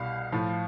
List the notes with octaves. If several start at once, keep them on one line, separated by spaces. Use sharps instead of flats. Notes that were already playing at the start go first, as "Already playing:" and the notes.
Already playing: C2 B2 G3 F5
A2 F3